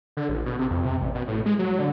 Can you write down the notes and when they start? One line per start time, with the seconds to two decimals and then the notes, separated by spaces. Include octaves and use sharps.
0.17 D3
0.29 A1
0.46 B2
0.59 C3
0.70 F2
0.85 C3
1.01 A1
1.15 B2
1.28 A2
1.46 G#3
1.59 F#3
1.79 D3